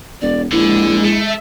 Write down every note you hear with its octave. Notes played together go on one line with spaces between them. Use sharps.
E1 D5
A#1 D3 G#3 E4
A3 E5